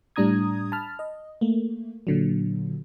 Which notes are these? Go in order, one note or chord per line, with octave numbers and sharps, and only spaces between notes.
A2 G3 D4 A#5 D#6 G#6
A5 B5 F6
D#5
A3 A#3
A#2 D3 F#3